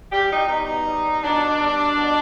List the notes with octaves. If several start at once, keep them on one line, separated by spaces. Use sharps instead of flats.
G3 G4
D#4
B2 D#4
G3
B2 D4
G3
B2